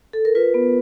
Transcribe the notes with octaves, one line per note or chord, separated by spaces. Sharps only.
A4
A#4
F4 B4
B3